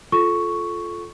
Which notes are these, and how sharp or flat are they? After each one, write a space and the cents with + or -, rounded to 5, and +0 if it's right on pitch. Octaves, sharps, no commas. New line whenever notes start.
F4 +0 A4 -20 C#6 +5